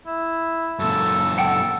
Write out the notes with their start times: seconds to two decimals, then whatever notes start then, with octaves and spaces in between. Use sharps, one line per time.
0.06 E4
0.79 F#2 A#2 A4
1.38 A4 F#5 G5